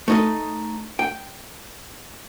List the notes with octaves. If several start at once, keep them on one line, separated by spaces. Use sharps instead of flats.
A3 D#4 D#5
G5